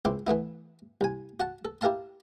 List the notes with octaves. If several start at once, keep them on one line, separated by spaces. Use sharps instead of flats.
C#2 C4 E4 C6 D6
E3 A3 B3 E4
C2 G#5
F#4 F#5 A5
A4
E4 G4 A#4 F5 A5 C6